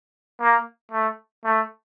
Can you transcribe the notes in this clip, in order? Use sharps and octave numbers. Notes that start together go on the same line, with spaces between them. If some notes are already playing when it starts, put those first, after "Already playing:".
A#3
A3
A3